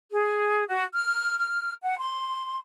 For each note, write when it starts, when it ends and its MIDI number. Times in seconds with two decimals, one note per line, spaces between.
0.12 0.63 68
0.67 0.83 66
0.94 1.36 89
1.38 1.73 89
1.82 1.96 78
1.98 2.57 84